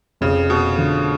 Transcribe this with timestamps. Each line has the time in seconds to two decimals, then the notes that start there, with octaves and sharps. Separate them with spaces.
0.21 F1 F2 C#3 F3
0.50 B2
0.77 D3 F3 A3